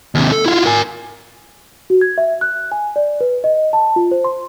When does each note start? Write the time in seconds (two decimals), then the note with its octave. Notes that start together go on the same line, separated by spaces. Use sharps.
0.15 D#2 C3
0.32 A4
0.46 E4 F4
0.66 A#4 G#5
1.90 F#4
2.01 G#6
2.18 E5
2.41 F#6
2.72 G#5
2.96 D5
3.21 B4
3.44 D#5
3.73 A5
3.96 F4
4.11 C5
4.24 C6